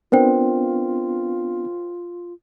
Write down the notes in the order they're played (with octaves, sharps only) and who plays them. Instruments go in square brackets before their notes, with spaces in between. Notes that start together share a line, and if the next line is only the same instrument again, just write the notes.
[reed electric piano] B3 C4 D4 [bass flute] F4 [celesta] A#4 C5 G5